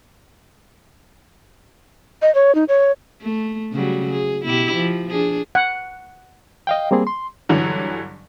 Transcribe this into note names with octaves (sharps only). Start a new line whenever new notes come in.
D#5
C#5
D#4
C#5
A3
C#3 F#3 G3
G#4
B2 E4 G4
F3
D4 G#4
F#5
D#5 F5 G5
G3 A#3 C4 G#4
C6
G2 D3 E3 F#3